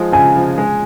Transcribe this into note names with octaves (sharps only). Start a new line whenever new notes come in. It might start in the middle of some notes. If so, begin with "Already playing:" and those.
Already playing: F3 G#3 D#4
C#3 G#5
F3
G#3